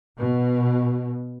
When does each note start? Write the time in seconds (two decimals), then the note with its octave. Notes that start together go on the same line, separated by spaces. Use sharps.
0.16 B2